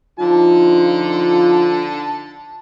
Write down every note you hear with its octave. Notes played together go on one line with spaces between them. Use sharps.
D3 F3 D#4 F4 A5